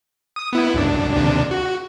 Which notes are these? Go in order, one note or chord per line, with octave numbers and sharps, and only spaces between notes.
D#6
B3 E4
C2 F#2 D4
D#2 C3 D4
F#4